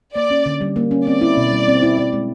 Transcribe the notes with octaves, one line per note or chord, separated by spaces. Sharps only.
A#3 D5
C#4
D3
G3
A#3
C#4
C4 D5
E4
B2
G3
C4
E4
E4
G#3